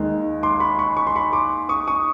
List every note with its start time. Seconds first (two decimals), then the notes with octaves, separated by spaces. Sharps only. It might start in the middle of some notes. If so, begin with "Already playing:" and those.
Already playing: D#2 D#3 G#3
0.43 C6 D6
0.60 B5 C#6
0.79 B5 C#6
0.97 C#6
1.07 C6
1.16 B5 C#6
1.33 C6 D6
1.69 C#6 D#6
1.87 C#6 D#6